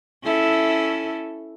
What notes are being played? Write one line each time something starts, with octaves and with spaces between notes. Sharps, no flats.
C#4 E4 A4